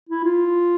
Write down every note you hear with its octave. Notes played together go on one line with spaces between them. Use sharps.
E4
F4